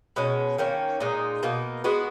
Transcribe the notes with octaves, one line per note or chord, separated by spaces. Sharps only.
B2 G#3 C#4
D#3 A#3 C#4
A#2 G#3 D#4
B2 A#3 D#4
G#3 B3 F#4